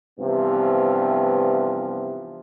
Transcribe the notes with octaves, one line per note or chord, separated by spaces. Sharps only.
G2 C3 E3 F3 B3